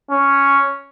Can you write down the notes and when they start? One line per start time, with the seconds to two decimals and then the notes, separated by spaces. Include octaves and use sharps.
0.11 C#4